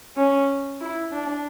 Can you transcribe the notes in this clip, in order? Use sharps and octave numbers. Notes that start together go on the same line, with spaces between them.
C#4
E4
D4